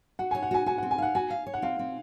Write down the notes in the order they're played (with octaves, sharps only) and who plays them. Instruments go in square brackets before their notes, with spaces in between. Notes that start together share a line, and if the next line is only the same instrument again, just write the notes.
[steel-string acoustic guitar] F#4 [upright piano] F#5
[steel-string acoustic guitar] C#5 [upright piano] G#5
[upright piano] F#5
[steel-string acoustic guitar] F#4 [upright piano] G#5
[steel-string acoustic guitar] F#4 [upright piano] G#5
[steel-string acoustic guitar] C4 [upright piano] F#5
[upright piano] G#5
[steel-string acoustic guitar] F5 [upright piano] F#5
[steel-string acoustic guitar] F#4 [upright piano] G#5
[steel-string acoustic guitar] F5
C#5
[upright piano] F#5
[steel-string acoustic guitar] C4 [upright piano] F5
[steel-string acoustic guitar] C4